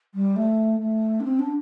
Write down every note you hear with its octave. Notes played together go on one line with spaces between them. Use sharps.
G3
A3
A3
D4
C4
D4